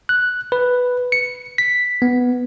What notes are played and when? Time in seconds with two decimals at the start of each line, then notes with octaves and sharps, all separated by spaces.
0.09 F#6
0.52 B4
1.12 C#7
1.58 B6
2.02 B3